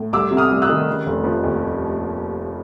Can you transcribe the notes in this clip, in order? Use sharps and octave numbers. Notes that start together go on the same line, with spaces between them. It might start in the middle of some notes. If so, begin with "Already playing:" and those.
Already playing: A2
C2 D6 E6
C3
D#6 F6
C2
E6 F#6
D#3
C#3
F1
F3
D#2